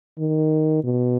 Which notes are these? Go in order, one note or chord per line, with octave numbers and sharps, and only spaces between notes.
D#3
B2